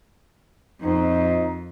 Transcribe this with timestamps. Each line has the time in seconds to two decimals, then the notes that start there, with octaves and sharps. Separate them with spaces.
0.81 F2 A#2 C4 D#4